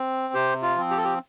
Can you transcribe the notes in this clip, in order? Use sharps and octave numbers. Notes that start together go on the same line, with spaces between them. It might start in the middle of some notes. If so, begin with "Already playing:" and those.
Already playing: C4
C3 G4 C5
F4
F3 C4
G4
A4
G4